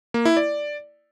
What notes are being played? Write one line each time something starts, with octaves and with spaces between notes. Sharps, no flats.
A#3
E4
D5